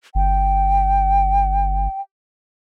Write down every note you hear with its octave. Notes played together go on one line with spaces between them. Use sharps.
G1 G5